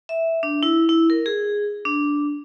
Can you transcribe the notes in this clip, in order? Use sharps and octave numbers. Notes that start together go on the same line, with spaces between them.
E5
D4
E4
E4
A#4
G#4
D4